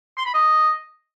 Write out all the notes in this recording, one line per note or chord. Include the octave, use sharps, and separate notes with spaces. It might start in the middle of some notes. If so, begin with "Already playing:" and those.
C6
B5
D#5